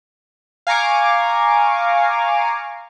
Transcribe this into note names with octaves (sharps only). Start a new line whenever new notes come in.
F5 G#5 A#5 C#6 D6